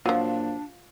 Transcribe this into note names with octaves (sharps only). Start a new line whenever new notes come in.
A#2 F3 F#3 D4 F4